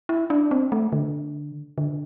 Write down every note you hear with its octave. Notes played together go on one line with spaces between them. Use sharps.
E4
D4
C4
A3
D3
D3